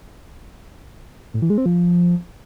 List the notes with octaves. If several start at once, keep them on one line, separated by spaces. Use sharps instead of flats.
A2
E3
G#3
C4
F3